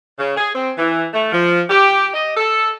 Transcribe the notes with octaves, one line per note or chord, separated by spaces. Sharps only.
C#3
G#4
C4
E3
A3
F3
G4
D#5
A4